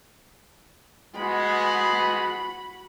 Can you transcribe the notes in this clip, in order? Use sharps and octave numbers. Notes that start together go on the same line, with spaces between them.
G#3 B3 F#4 B5